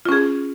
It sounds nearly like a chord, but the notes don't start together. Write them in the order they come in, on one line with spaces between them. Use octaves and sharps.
F4 C#4 G#4